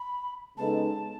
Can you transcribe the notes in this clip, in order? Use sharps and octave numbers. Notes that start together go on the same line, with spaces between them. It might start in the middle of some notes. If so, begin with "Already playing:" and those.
Already playing: B5
C#3 G#3 B3 D#4 A4 A5